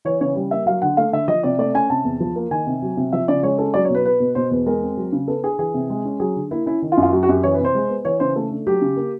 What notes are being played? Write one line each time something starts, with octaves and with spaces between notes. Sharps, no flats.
E3 C#5
C#3 C#5
G3
A#3 E5
F#3 F5
D3 F#5
A3 F5
D3 E5
F3 D#5
C3 D5
A3 D5
C#4 G#5
C3 A5
E2
F3
A#3
D#3 G#5
C3
F#3
C3
F3 E5
C#3 D5
G#3 C#5
C#4 A4
F#3 D5
C#5
B2
B4
B3 B4
B2
B2 C5
E2 B4
G#3 A#4
C4
F#3
C#3
B3 A4
D4 G#4
E3 G#4
C3
G#3
C#4
F#3 G#4
D3
A#3 E4
C#4 E4
D#3
F4
F#2
F4
F#3 F#4
F#4
F#2 G4
E3 C#5
B4
C3
C5
G#3
B3
E3 C#5
C#3 C5
A3 A4
D4
F#3 G4
C#3
A#3